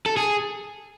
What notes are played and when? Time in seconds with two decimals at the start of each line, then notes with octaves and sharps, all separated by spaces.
0.06 A4
0.17 G#4